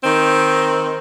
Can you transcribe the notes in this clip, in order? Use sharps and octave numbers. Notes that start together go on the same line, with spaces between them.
D#3 C4 D#4